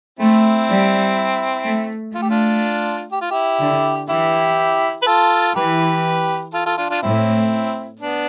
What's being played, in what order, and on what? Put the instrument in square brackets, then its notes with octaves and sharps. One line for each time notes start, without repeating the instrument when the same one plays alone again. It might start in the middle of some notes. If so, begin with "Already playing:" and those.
[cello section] A3 [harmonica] C4 E4
[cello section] G3
A3
[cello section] A3 [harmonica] F4
[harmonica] G4
D4 F4
G4
F4
E4 G4
[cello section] D3
[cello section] E3 [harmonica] E4 G4
[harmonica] B4
F4 A4
[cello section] E3 [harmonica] G4 B4
[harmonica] F4 A4
F4 A4
D4 F4
D4 F4
[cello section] A2 [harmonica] C4 E4
[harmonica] B3 D4